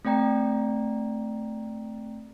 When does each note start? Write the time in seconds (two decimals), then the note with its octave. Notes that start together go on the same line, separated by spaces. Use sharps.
0.05 A3 C4 D5 G5 A#5